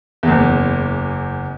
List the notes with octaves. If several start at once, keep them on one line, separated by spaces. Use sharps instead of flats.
F#1 E2